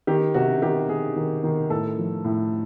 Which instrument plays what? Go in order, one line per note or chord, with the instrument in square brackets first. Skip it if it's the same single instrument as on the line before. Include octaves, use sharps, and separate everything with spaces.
[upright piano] D#3 G4
C3 F#4
D#3 G4
D#3 G#4
D#3
D#3
A2 A4
F3
A2